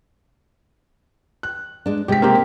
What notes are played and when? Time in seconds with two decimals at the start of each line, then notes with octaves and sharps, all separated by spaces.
1.43 F#6
1.86 G#3 D4
2.08 C3 G#3 G4 B6
2.22 A#3 C4 G4